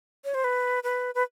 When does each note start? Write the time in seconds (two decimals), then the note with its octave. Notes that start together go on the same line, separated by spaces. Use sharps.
0.24 C#5
0.34 C5
0.44 B4
0.83 B4
1.15 B4